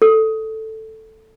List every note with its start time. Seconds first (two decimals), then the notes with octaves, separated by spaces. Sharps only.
0.02 A4